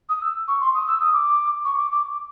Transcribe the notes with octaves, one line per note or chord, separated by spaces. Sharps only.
D#6
E6
C#6
C6
D#6
E6
D#6
D6
C#6
D6
D6